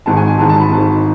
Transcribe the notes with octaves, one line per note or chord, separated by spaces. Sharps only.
G#1 G#2 D#3 A5
G#5
G#5
G#1 G#2 D#3 A5
A5
B5
G#1 G#2 D#3